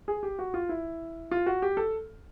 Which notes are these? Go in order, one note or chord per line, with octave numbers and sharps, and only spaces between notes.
G#4
G4
F#4
F4
E4
F4
F#4
G4
A4